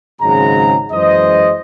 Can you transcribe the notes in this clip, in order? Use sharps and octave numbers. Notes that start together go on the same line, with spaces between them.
G#1 G#2 C#3 F#3 G#3 A#5
F#2 E3 G#3 C5 D#5